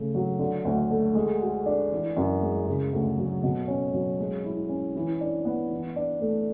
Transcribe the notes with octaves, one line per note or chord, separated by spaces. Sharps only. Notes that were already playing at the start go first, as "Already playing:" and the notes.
Already playing: C#3 A3
F#3
D3
D2
A3
G#3
F#4
D4
E3
F#2
G#3
C#3
D2
F#3
B2
C#4
F#3
G#3
E4
C#4
E3
D4
B3
E3
D4
A3